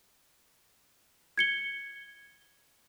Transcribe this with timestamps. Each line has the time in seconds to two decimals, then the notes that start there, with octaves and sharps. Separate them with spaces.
1.38 G#6 C#7 G7